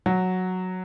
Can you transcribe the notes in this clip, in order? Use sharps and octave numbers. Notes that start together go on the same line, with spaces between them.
F#3